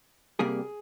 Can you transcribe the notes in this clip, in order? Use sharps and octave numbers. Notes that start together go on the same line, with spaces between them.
C3 G3 A#3 G#4